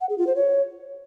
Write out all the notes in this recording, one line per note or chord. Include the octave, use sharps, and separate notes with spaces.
F#5
G#4
F4
C5
C#5